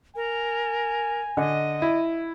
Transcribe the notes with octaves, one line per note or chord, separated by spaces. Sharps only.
A#4 G#5
D3 D#5
E4